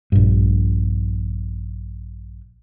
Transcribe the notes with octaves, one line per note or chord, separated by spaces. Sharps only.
A#1 G2